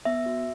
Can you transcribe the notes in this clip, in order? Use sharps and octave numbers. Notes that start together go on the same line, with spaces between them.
B3 E5
F#4